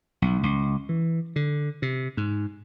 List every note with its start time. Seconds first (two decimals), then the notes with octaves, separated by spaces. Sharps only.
0.22 B1
0.43 C#2
0.89 E3
1.36 D3
1.82 C3
2.17 G#2